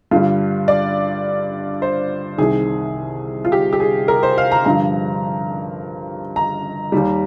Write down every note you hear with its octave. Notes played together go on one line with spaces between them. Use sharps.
G2 D3 G3 F4
D5
C5
C2 C3 D#3 G#4
F4
G4
G4
G#4
A#4
C5
F5
A#5
G2 D3 F3 A#5
A#5
D#2 D#3 G3